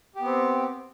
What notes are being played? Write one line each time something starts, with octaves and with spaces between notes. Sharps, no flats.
B3 C4 G4